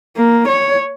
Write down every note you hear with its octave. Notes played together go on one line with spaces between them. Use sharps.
A#3
C#5